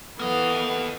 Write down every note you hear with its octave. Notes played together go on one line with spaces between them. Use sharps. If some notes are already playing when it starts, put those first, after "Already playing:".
E3 A#3 B3 A4 D#5 F5